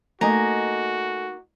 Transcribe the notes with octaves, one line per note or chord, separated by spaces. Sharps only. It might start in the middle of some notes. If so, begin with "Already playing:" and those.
A3 A#3 D#4 F#4 D#5 G#5 A#5